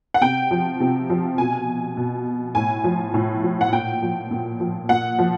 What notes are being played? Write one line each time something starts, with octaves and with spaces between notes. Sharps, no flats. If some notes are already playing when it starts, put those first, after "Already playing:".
F#5
C3 G5
F3
C3
F3
B2 G#5
B2
A2 G#5
F3
A2
F3
F#5
A#2 G5
F3
A#2
F3
A#2 F#5
F3